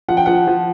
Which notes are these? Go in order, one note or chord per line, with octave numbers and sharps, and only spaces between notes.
F3 F#5
G5
F3 F#5
F3